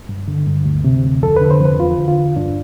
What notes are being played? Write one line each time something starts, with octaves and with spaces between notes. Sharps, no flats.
G2
D3
G2
D2
C3
D2
F2 A4
B4
D3
C5
F2 B4
E2 F4
D3
F4
E2
G2 D4